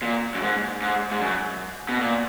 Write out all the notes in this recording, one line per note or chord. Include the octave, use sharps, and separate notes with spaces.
A#2
F#2
G#2
G#2
G#2
F#2
B2
A#2